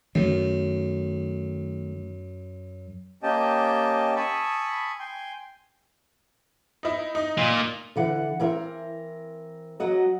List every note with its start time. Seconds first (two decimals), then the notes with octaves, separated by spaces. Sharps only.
0.15 F#2 D#3 A3
3.23 A#3 C#4 G4 D#5 G5 A5
4.16 G#5 A5 B5 C#6 D#6 E6
4.99 G5 G#5 C6
6.83 D#4 E4
7.15 D#4
7.38 A#2
7.96 D3 E3 F#5
8.40 E3 C4 A#4
9.80 F#3 F#4 D#5